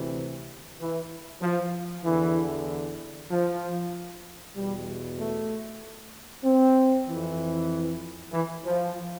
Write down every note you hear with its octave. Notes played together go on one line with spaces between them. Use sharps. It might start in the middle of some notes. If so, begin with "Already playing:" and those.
Already playing: D2 C3 E3
E3
F3
E2 D3 E3
F3
E2 B2 G3
A3
C4
F2 E3
E3
F3